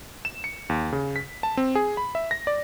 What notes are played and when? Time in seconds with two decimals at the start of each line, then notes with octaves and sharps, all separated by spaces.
0.25 E7
0.44 C#7
0.69 D#2
0.92 C#3
1.16 B6
1.43 A5
1.57 C4
1.75 G#4
1.97 B5
2.15 E5
2.31 A#6
2.47 D5